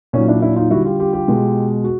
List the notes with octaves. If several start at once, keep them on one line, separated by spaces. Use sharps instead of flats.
A#2 F#3 C#4 D#4
D4 E4
D4 E4
D#4 F4
D3 G3 E4 F#4
F4 G4
F4 G4
F4 G4
B2 G#3
F#4